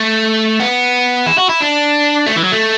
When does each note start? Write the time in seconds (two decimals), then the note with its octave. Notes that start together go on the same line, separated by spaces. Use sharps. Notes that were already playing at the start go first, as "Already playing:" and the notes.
Already playing: A3
0.60 B3
1.26 E4
1.38 F#4
1.49 E4
1.60 D4
2.26 A3
2.36 E3
2.44 F#3
2.52 A3